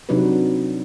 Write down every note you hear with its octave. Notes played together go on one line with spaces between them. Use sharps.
C3 F#3 D4 D#4 F#4 B4